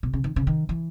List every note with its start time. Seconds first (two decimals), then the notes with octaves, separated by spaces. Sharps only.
0.03 B2
0.13 C#3
0.24 D#3
0.36 C#3
0.47 D#3
0.69 E3